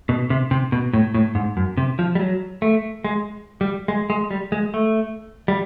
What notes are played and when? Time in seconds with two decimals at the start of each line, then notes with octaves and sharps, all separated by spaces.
0.09 B2
0.30 C3
0.51 C3
0.72 B2
0.93 A2
1.14 A2
1.35 G#2
1.57 F#2
1.77 C3
1.99 F3
2.15 G3
2.20 F#3
2.62 A3
3.04 G#3
3.61 G3
3.88 G#3
4.10 G#3
4.31 G3
4.52 G#3
4.74 A3
5.48 G3